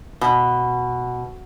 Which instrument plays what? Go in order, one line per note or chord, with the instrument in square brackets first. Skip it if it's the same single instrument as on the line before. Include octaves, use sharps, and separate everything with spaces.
[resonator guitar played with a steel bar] B2